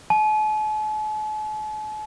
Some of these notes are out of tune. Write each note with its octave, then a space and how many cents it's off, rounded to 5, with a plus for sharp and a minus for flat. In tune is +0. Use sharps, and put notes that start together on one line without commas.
A5 -45